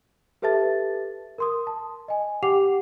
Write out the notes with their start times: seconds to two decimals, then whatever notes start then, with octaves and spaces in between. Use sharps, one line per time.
0.42 G4 A4 B4 E5 A5 A6
1.38 A#4 C6 D#6
1.67 A5
2.08 D#5 G#5
2.43 G4 F#5 G5 D6 C7 F7